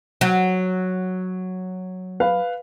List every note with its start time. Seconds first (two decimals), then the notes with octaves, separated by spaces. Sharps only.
0.21 F#3
2.20 B4 F5